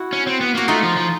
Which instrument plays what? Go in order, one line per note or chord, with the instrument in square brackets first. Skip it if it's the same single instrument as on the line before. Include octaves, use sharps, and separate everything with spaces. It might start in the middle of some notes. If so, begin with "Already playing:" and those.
Already playing: [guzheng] E4 F#4
[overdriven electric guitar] C#4
C4
B3
[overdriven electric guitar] A#3 [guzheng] F#4
[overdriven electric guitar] A3 [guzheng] D#4 F4
[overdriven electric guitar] F3
F3